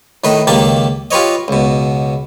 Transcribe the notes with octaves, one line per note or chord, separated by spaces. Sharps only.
A2 D#3 B4 D#5
C#2 D#3 A#3 G4 E5 A5
F4 G4 B4 C#5 D#5
C#2 B2